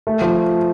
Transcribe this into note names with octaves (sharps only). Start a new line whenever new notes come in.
A3
F3